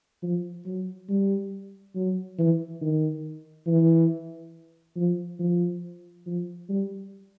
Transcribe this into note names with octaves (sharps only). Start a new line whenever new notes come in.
F3
F#3
G3
F#3
E3
D#3
E3
F3
F3
F3
G3